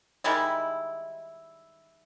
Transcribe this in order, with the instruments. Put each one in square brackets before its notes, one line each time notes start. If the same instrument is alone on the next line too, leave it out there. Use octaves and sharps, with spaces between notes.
[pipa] D#3 G3 G#3 E4